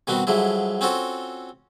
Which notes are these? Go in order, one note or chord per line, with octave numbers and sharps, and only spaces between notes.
B2 D#3 G3 B3 C4 F#4
G2 D3 F3 F#3 G#3 E4
C4 C#4 F4 F#4 A4 C5